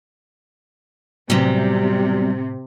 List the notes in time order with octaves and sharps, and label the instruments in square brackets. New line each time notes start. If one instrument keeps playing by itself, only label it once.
[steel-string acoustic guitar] E2 F#3 G3 [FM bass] A2 [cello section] C3